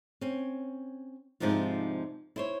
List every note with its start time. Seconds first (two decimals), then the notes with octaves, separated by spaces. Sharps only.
0.21 C4 C#4
1.40 G#2 C3 F3 D4 D#4 F4
2.36 E4 C5 C#5